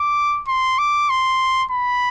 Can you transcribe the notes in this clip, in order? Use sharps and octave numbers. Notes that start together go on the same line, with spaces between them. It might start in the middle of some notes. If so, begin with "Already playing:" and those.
Already playing: D6
C6
D6
C6
B5